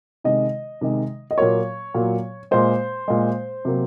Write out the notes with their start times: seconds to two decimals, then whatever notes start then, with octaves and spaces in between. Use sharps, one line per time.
0.24 C3 D#3 G#3 D#5
0.81 C3 D#3 G#3
1.31 D#5
1.38 A#2 F#3 A#3 C#5
1.95 A#2 F#3 A#3
2.51 A#2 G#3 C5
3.08 A#2 G#3
3.65 C3 F#3 A#3